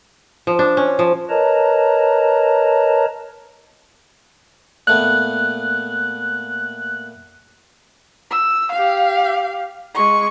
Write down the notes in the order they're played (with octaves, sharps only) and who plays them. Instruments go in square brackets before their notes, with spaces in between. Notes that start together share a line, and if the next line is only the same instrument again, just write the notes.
[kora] F3
D4
C#4
F3
[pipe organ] A#4 B4 C#5 D#5 A5 A#5
[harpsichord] A#2 A3 B3 [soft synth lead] F#6
[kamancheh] E6
G4 F5
G#3 C#6